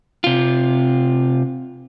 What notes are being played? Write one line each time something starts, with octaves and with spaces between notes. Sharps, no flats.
C3 F4